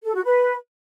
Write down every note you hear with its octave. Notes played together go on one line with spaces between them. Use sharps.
A4
F#4
B4